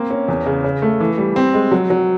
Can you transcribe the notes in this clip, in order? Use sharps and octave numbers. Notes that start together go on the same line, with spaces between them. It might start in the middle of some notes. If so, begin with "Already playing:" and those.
Already playing: A#3 C4
C#4
E2
C#3
C#3
A3
E3
G3
C4
G#3
F#3
F#3